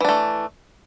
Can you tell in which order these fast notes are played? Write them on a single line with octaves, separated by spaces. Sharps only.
E3 D4 A3